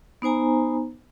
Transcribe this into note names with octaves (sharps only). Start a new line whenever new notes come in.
B3 D#4 C5 G#5 A#5